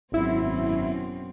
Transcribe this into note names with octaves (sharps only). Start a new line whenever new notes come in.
G#1 F#2 B2 C4 E4